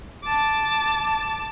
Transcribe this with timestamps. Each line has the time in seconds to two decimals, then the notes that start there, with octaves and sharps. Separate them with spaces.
0.24 A5 D6